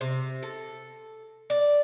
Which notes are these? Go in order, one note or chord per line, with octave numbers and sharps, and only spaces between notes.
C3
A4
D5